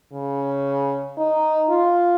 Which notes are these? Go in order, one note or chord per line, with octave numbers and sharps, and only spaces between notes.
C#3
D#4
F4